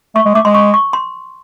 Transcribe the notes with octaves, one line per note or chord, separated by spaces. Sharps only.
A3 C#6
G#3
A3 D6
G#3 C6
C#6
C#6
C6